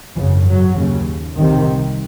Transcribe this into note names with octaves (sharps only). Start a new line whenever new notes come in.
G#1 F#2 C#3 E3
F#3
D#2 C#3
C2 C3 D#3